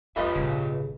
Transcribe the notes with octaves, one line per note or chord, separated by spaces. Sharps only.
E2 F4 G4 B4 D#5 E5 B5
G#1 A#2 C#3